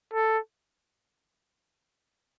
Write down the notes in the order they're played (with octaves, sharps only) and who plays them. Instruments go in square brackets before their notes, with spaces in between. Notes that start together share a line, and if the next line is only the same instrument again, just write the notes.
[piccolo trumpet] A4